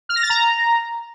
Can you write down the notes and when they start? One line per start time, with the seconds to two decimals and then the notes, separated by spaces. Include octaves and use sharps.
0.09 F6
0.16 A#6
0.23 A6
0.30 A#5